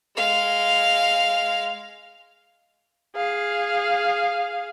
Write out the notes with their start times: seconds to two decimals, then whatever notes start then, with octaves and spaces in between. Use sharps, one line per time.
0.16 G#3 F5
3.16 G#4 F5